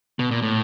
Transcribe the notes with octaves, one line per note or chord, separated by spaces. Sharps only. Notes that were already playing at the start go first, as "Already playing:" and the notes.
B2
A#2
A2